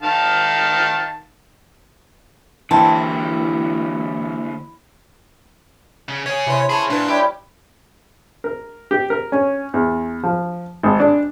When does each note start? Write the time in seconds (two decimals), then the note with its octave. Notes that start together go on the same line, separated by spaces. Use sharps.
0.02 D#3 F5 A5
2.71 D3 E3 A#3 C4 E4 A5
6.09 C#3
6.26 C#4 G#4 C#5
6.47 C3 E3 C5 C#5 C#6
6.70 G#4 C#5 A5 B5
6.90 A#2 D4 B4
7.08 G3 E4 G4 C#5
8.44 A#4
8.91 G4
9.10 A#4
9.32 C#4
9.74 E2
10.23 F3
10.83 G#1
11.00 D4